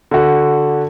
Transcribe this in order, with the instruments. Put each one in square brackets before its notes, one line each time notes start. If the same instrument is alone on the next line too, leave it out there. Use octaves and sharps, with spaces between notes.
[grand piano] D3 F#4